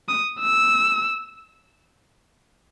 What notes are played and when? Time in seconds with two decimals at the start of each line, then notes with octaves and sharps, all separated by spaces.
0.09 D#6
0.41 E6